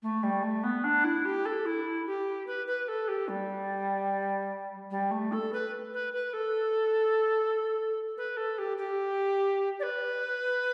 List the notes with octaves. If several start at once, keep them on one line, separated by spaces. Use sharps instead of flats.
A3
G3
A3
B3
D4
E4
G4
A4
E4
G4
B4
B4
A4
G4
G3
G3
A3
A4
B4
B4
B4
A4
B4
A4
G4
G4
D5
B4